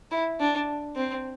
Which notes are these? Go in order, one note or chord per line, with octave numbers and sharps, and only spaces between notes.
E4
D4
C4